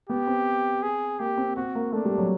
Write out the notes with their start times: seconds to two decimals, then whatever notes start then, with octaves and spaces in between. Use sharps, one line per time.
0.09 B3 G4
0.27 C4
0.83 G#4
1.20 A#3 G4
1.38 C4
1.57 C4 F#4
1.75 A#3
1.93 A3 D4
2.05 G3
2.18 F#3